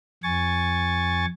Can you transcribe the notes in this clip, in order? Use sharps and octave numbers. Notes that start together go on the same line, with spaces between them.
F2 G#5 C#6 A6